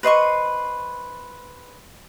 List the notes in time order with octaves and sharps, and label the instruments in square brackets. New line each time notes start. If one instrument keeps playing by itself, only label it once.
[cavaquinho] B4 C5 D#5 C#6